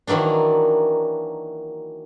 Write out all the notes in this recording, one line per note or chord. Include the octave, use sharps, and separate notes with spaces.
D#3 E3 F#3 A#3 D4